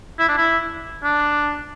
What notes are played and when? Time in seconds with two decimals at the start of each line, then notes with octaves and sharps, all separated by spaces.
0.19 E4
0.28 D4
0.38 E4
1.04 D4